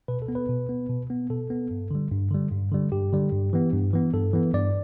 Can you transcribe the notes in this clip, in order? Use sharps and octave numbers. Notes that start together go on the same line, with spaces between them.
B2 B4
A4
B3
B4
B2
B3
B2
B3
B2 A4
B3
G2
D3 G3
G2
D3 G3
G2
D3 G3
G2 G4
D3 G3
G2
E3 B3
G2
E3 B3
G2 A4
E3 B3
G2 D5